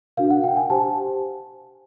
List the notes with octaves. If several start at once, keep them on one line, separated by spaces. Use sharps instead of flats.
D4 F#4 A#4 F5
F#5
G5
G#5
G4 C5 A5